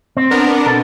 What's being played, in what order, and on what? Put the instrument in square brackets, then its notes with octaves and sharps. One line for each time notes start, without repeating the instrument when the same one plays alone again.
[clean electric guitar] C4
[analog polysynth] B3 D4 A#4
[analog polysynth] B2 [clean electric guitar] A4